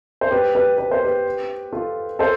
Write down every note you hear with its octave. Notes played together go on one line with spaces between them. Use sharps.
C5
G4 B4
G4 B4
B4
C5
G4 B4
F4 A4
A4 C5